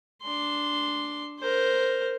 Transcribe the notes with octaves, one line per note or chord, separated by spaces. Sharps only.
D4 C6
A#4 C5